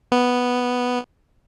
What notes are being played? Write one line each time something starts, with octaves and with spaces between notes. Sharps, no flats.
B3